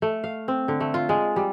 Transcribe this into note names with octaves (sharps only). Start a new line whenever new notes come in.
A3
F5
C4
D3
A3
F4
G#3
G3